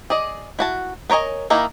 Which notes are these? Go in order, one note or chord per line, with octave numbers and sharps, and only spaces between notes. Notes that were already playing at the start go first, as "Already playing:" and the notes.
G#4 D5 D#5
E4 F#4 A5
B3 A#4 C#5 D#5 G#5
D#3 A#3 D#4 E4